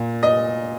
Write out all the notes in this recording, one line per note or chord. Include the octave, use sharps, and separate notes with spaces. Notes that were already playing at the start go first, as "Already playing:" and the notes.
Already playing: A#2
D#5